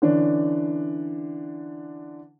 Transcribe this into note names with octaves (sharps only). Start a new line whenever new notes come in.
D3 E3 C#4 D4